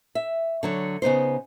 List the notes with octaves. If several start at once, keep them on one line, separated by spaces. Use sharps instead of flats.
E5
D3 F#3 C#5
C#3 B3 D#4 C5